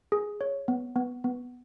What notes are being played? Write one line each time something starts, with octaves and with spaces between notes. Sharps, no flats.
G#4
C#5
B3
B3
B3